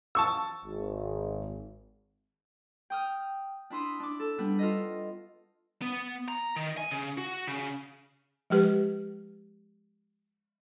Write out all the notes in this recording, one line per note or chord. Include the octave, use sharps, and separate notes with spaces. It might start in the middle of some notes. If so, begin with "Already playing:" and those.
A5 C#6 E6
G#1
G5 D#6 F6
D4 E4 C6 D#6
D4 D6
A4
G3 B3 D4
F4 A4 D#5
B3
A#5
D#3
G#5
C#3
F#4
C#3
F3 G#3 G4 B4